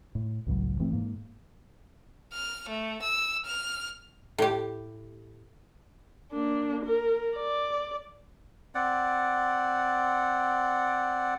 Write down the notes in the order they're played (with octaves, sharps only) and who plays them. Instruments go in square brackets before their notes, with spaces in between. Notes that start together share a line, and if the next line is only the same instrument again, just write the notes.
[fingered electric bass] A2
G#1 C#2 A2 F#3
G1 E3 A3 C4
G#2 A#3
[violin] F6
A3
E6
F6
[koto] A2 G4
[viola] A#3 D4
A#4
D5
[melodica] C4 D5 F#5